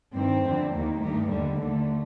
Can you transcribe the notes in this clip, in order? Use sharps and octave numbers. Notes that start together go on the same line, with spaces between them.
G2 D#3 C4
F2 D3
D#2 D#3 A#3
G2 D#3 A3
D#2 D3 G3
D#2 D3 A3